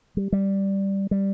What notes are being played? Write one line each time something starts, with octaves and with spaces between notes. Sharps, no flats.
G3
G3
G3